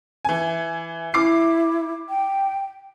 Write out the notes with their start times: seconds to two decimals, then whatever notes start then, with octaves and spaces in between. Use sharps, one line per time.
0.25 E3 G#5
1.14 E4 D6 C7
2.09 G5